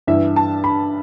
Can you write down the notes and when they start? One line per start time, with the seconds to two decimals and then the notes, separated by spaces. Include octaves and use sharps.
0.07 G2 E3 E5
0.36 A5
0.64 B5